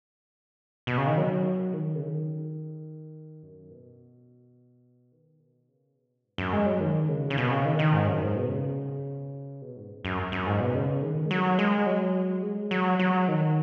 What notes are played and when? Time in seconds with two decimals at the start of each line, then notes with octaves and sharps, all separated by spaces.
0.87 B2
0.98 C#3
1.07 D#3
1.18 F#3
1.74 D#3
1.95 C#3
2.03 D#3
3.43 F#2
3.71 B2
5.12 D#3
5.40 B2
5.69 C#3
5.96 B2
6.24 G#2
6.38 F#2
6.53 G#3
6.66 F#3
6.81 D#3
7.08 C#3
7.30 C#3
7.38 B2
7.51 C#3
7.65 D#3
7.79 D#3
7.93 G#2
8.07 F#2
8.21 G#2
8.36 B2
8.49 C#3
9.62 B2
9.76 G#2
10.05 F#2
10.32 F#2
10.47 G#2
10.60 B2
10.75 C#3
11.02 D#3
11.26 G#3
11.31 F#3
11.59 G#3
11.86 F#3
12.43 G#3
12.71 F#3
12.99 F#3
13.28 D#3